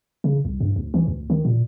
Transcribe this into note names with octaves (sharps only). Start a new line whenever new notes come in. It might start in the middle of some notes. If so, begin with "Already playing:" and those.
C#3
C2
G2
D2
E3
D2
D#3
A#2